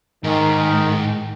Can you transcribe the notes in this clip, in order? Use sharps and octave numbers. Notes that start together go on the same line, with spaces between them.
G#2 D#3